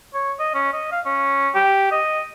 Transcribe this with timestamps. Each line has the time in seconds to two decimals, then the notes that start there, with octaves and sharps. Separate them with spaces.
0.14 C#5
0.39 D#5
0.54 C#4
0.73 D#5
0.92 F5
1.05 C#4
1.55 G4
1.91 D#5